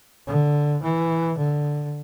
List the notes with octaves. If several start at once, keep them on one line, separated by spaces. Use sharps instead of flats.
D3
E3
D3